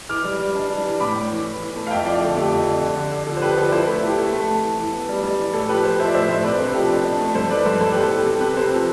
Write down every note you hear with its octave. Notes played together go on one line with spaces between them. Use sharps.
E3 D6 F6
G3
G3
D4
G3
E3
A2 B5 D6
A2
E3
E3
E3
A3
F5
F2 E5 G5
F3 D5 F5
D3 A4
A3 G4
F2
D3
D3
D3
D3
F3 A4
C5
D3 G4 B4
F3 A4 C5
D5
E4 A4 C5
B4
A4
A3
A4
E4 G4
A3 A4
A3
A3
E3
E3
B3
G3
G3
E3
A2 A4
F3 G4 B4
F3 A4 C5
F3 C5 E5
D5
A2 C5 E5
A2 C5 E5
C3 B4 D5
D4 A4 C5
F3 G4 B4
D4
D4
A3
G2 A4 C5
E3 B4 D5
G2 A4 C5
G2 A4 C5
G4 B4
B3
A4
E3 G4
C4 A4
C3 G4 B4
C3 A4 C5
F3